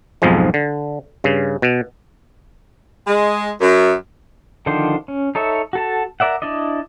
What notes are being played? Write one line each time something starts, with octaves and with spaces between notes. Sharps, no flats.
B1 F2 G#2 F3 G#3
D3
G2 C#3
B2
G#3
F#2
D3 D#3 F3 D4 C5
C#4
D#4 A4 C#5 E5
F#4 A4 A5
A#4 D5 E5 F#5
D4 E4 D5 D#5